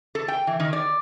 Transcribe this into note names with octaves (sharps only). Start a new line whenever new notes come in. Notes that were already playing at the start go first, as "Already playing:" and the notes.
A4
G5
E3
D#3
D5